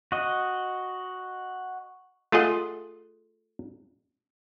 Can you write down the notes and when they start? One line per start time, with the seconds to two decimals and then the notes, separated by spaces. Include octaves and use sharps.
0.12 F#4 D#5
2.32 A3 F4 G#4 D#5 F#5